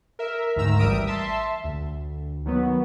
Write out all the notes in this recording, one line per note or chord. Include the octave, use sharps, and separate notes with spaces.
A#4 E5
D2 G#2 D#3 A#5 E6
A1 G3 A#4 E5 D#6 D7
E5 A5 C6
D2
D#3 F#3 B3